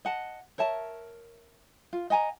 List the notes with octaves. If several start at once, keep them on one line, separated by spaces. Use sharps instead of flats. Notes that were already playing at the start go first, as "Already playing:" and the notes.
D#5 F#5 A5
A#4 C#5 E5 A5
F4
D#5 F#5 G#5 A#5